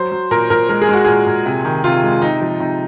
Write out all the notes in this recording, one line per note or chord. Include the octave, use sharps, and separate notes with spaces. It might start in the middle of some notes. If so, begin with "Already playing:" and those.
Already playing: F#3 C5
F#3
A#2 A#4
A#2 A#4
G#3 A#4
G#4
G#3 F#4
A#2 G#4
A#2
C3
D#3
C3 F4
G#3
C3 D#4
F3
C3 D#4